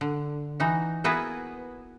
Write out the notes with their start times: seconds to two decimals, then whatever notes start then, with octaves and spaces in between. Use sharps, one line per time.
0.01 D3
0.60 E3 D#4 F#4
1.04 A#3 B3 E4 F#4 G#4 B4